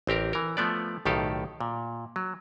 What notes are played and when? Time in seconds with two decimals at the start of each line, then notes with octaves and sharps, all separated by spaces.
0.07 A1 C4 G4 A#4
0.33 E3 A#4
0.57 F3 A3 B3 D5
1.05 B1 A2 D#3 G4 A4 F5
1.61 A#2
2.16 F#3